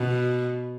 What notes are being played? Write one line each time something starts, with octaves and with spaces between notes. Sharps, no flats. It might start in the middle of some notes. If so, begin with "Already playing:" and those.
Already playing: B2